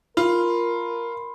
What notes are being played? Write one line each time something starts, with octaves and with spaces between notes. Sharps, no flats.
F4 A#4 B5 C6